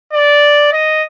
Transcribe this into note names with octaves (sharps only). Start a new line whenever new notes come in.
D5
D#5